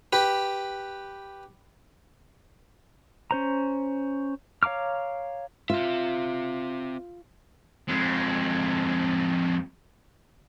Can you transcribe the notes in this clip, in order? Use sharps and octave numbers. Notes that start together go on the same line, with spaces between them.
G4 B4
C#4 C5 A#5
C#5 F5 A#5 D6 F6
C4 F4 E5
F2 G#3